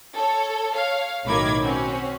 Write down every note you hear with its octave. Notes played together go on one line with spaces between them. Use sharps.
A4 C#5
C#5 F5
B1 A2 D#3 B5 D6 G#6
C4 C#4 F#4